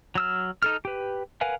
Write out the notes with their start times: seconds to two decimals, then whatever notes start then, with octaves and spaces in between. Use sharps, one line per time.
0.15 F#3 E6 F6
0.62 D#4 A4 F6
0.85 G4 B4
1.41 A#4 B4 F5 F#5 G#5